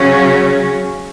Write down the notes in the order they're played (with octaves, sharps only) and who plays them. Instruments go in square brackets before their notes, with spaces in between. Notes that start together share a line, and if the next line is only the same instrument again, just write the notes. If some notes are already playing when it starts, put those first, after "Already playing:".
Already playing: [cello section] C#3 F#3 C#4